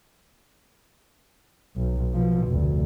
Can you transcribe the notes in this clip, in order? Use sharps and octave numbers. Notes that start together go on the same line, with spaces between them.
B1
B2 F3
F1 D2